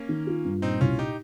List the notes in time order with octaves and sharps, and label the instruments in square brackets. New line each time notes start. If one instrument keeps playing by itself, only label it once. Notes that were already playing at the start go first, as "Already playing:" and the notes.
Already playing: [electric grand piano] A#3 C#4
[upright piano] D#3
F4
G2
[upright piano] A#2 [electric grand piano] C4 D#4
[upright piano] C2 [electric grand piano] C#4 F4
[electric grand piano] D#4 G4